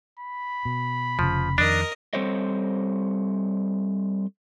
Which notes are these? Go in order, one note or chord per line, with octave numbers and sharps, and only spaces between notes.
B5
B2
F1 C#3 F3
F2 D#3 D4 A#4 D#5
G3 C4 A4 C5 C#5 D#5